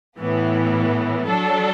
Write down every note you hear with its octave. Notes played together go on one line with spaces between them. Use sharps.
A2 E3 B3
F#3 D4 A4